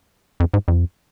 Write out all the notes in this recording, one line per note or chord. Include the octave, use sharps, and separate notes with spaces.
F2
G#2
F2